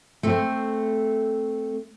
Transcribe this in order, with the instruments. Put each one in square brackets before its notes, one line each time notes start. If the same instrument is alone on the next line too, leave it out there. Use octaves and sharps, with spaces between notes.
[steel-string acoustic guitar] A3 C4